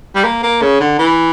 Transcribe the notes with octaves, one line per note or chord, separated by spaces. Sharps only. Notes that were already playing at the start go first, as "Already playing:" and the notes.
G3
A#3
A#3
C#3
D3
E3